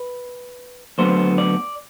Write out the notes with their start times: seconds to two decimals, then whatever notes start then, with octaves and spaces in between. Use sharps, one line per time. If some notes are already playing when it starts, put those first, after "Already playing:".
Already playing: B4
0.98 D2 D3 F#3 B3 C5
1.38 D5